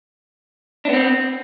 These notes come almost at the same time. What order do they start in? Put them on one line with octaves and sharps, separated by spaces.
D4 B3 C4